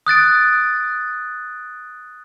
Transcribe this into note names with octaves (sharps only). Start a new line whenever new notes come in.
D#6 F#6 A6 D7